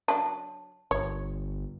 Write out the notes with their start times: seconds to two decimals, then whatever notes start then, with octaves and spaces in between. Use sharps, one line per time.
0.08 F#3 D4 A5
0.91 G1 C#5